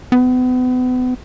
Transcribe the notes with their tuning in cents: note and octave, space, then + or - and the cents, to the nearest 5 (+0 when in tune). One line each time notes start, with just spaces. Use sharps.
B3 +35